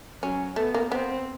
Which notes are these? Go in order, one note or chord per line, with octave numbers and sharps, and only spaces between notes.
F#3 C#4
A3 B3
A#3
B3 C4